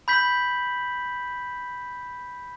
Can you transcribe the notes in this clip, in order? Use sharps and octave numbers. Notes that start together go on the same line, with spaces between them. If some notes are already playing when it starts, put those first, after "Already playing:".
B5 G6 B6 F#7